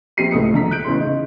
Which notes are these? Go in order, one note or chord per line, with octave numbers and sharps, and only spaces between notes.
A#1 C4 G4 C7 D#7
C#2 A2 A3 D#6 C#7
A#1 D3 A#5 B6
F#6 G6 D7
A1 E2 C#3 C6
C#3 D#4